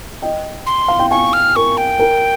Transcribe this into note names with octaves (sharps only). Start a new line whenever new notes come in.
D#5 G5
C6
F5
G5
F5 G#5 C#6
F6
A#4 C#6
G5
A#4